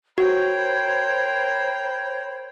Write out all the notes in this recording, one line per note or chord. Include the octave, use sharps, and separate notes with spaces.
F#4 A#4 C5 C#5 G5 B5